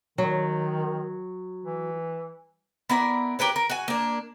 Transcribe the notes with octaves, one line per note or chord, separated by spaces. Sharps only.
D#3 F#3
E3
B3 E4 A#4 D5
G4 A#4 B4 C#5
A#4
F#4 G#5
A#3 D4